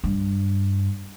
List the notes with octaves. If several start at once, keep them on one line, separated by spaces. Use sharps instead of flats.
G2